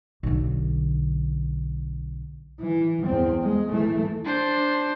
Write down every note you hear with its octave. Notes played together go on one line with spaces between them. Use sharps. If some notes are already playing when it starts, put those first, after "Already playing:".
B1 D3
E3
E2 C4
G#3
E3 A3
D4 C5